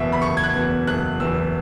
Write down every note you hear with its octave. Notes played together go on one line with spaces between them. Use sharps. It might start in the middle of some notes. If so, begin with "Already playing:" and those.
Already playing: F#1 E2 B2 E5
B5
F#1 C#6
G#6
F#6
E2 B2
F#1 F#6
E2 B2 E6